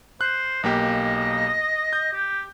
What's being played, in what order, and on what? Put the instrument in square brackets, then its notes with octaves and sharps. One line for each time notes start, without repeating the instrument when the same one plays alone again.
[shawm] C5 [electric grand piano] F#6
[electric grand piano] B1 A#3 G4 [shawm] D#5
[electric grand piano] G6
[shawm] G4